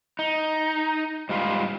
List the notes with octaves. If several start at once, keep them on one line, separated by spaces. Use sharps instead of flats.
D#4
G#2 G3 F4